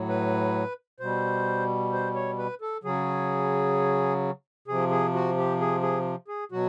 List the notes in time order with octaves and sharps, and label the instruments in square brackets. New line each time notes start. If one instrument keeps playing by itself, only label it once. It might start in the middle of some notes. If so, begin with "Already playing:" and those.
Already playing: [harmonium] A2 F#3
B4
B2 G3 C5
C5
C#5
B4
A4
C#3 F#3 G#4
C3 F3 G#4
G#4
F#4
G4
G#4
G#4
G#4
B2 F#3 F#4